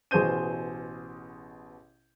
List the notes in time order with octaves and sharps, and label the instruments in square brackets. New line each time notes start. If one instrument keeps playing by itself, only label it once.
[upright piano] A1 B2 G#4 C5 G6 D#7